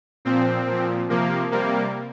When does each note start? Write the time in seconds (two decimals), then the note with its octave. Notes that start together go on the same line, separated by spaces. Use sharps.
0.25 A#2 F3 C4
0.67 A#2 F3
1.09 C3 F3 A#3
1.51 C3 G3 A#3